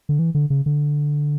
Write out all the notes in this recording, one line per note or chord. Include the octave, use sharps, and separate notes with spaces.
D3
E3
D3
C#3
D3